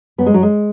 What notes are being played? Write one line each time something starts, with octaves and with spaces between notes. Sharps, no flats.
F#2 B3
G#3
F#2 F#3
G#3